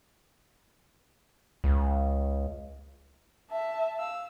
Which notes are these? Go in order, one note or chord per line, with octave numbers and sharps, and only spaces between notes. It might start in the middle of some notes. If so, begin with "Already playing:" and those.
C#2
E5 A5
F5 E6